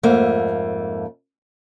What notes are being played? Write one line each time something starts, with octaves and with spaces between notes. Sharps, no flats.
F2 G#2 A3 A#3